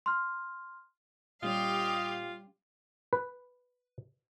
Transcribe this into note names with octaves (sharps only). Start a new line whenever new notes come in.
C6 F6
A#2 G3 C#4 F4 G4 D#5 F5
B4